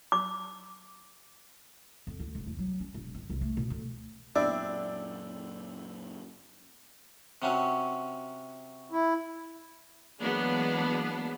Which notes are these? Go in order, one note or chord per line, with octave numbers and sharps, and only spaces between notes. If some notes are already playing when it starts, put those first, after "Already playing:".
D6
F2
D2
E1
E2
F#3
C#4
E1
F2
C2
A3
B2
D2
F#2 A#2 C4 D4 E4 D5
C3 F#3 C#4
E4
E3 F#3 G#3 A#3 B3 D4